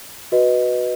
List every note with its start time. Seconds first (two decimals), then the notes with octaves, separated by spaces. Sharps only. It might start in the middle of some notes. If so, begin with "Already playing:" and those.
0.32 F#4 B4 D#5